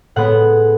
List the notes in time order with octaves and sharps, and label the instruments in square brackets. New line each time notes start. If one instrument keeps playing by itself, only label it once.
[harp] A2 G#3 B3 F#5